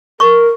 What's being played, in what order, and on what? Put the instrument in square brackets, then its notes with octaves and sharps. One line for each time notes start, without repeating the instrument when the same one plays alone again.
[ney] A#4 [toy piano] C#6